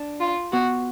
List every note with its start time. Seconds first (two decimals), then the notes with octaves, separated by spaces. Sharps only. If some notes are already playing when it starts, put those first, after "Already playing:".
Already playing: D4
0.20 F4
0.52 B3 F#4